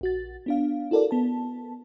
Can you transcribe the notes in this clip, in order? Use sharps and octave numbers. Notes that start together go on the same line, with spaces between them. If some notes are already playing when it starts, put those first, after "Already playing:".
A#1 F#4 A6
B3 D4 F5
E4 F#4 A4 A#4 D5
B3 A5